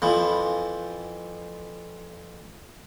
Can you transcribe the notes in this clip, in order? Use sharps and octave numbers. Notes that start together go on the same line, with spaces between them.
F2 E3 F3